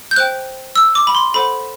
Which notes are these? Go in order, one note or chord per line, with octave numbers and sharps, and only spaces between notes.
G6
C5 G5 F#6
E6
D6
B5
C6
A4 C5 F#5 B5